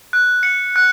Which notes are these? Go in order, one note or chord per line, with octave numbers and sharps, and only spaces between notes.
F#6
C#7
F#6